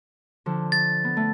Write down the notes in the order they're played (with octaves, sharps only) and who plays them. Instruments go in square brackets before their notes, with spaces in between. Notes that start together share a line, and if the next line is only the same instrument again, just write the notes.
[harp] D3 F3
[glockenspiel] A6
[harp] B3
A3